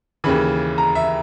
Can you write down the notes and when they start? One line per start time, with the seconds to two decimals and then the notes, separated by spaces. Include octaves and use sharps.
0.24 D#2 C#3 E3 B5
0.78 A#5
0.95 E5